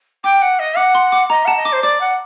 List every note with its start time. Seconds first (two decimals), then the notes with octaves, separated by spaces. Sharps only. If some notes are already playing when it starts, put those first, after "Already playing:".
0.24 G5 D6
0.42 F#5
0.59 D#5
0.77 F#5 D6
0.95 C6
1.12 D6
1.30 D#5 A#5
1.45 F#5 A5
1.56 D#5
1.65 D6
1.72 C5
1.82 D5 D6
2.00 F#5